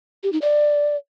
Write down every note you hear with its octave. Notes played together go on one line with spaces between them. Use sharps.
G4
D#4
D5